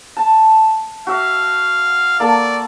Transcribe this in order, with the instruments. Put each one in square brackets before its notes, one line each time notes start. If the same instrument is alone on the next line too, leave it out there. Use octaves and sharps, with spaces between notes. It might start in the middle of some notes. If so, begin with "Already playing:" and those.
[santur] A5
[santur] F#4 E5 [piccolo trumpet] F5
[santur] A#3 A4 [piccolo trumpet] D5